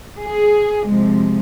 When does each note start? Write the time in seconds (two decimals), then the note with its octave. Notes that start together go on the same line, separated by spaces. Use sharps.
0.21 G#4
0.89 C3 F3 G#3